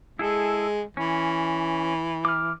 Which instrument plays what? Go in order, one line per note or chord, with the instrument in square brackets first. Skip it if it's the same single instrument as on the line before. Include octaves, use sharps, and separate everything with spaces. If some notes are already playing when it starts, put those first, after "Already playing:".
[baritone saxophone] G#3 [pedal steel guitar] E4 G#4 A4
[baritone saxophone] E3 [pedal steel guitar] C#4
[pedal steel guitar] D6 F6